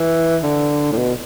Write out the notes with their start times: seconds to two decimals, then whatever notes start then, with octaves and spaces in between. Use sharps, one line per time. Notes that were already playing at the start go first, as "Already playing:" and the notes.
Already playing: E3
0.43 D3
0.92 A2
0.97 B2